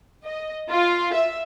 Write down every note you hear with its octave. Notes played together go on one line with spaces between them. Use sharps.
D#5
F4
E5